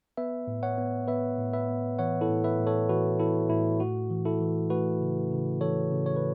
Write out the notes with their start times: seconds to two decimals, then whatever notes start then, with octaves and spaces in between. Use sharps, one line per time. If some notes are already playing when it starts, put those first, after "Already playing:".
0.17 B3 B4 E5
0.47 A2
0.63 C#5 F#5
0.78 B3
1.08 B3 B4 E5
1.39 A2
1.53 B4 E5
1.68 B3
1.99 E3 C#5 F#5
2.21 E4 A4
2.29 A2
2.44 B4 E5
2.59 A2
2.67 A4 C#5
2.89 E3 F#4 B4
3.19 E3 E4 A4
3.50 A2 E4
3.80 A3 F#4
4.10 E3
4.25 E4 A4
4.40 E3
4.70 A3 F#4 B4
5.01 C#3
5.31 C#3
5.61 E3 A4 C#5
5.91 C#3
6.06 C#5
6.16 B4